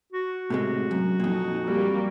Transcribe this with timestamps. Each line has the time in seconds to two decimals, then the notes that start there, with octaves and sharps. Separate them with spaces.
0.12 F#4
0.50 A2 C3 G#3
0.91 F#2
1.20 F2 A#2 D#4
1.66 G3 A#3